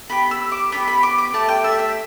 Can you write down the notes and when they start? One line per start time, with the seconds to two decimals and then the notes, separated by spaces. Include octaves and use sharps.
0.10 B3 G4 B5
0.31 E6
0.52 D6
0.72 B3 D4 G4 B5
0.88 B5
1.03 D6
1.18 D6
1.34 A3 G4 A5
1.49 G5
1.64 E5
1.79 E5